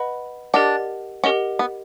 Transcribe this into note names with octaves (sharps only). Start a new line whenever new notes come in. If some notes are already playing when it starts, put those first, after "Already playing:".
Already playing: B4 D#5 F#5 B5
D4 G4 A#4 D#5 F#5
C#4 G4 A#4 D#5 F#5
B3